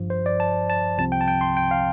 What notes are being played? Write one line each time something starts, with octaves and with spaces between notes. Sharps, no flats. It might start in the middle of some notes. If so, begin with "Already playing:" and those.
Already playing: G1 G2 F3
C5
D5
A5
A5
C2 C3 F3 C4 A5
G5
A5
G5
C6
G5
F5